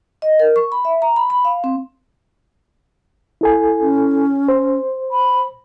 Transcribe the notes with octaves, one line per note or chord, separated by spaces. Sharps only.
D#5
A#4
C#6
B5
E5
A#5
B5
B5
F5
C4
E4 A4 G#5
C#4
C5
B5